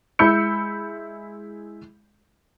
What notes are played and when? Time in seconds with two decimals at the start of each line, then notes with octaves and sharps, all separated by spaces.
0.19 G#3 E4 B5 E6 G6 C#7